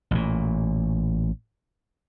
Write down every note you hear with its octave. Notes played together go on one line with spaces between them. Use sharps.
A1 A#2